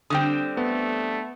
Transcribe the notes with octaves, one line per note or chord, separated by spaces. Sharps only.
D3 G3 C4 G5 D#6
A3 B3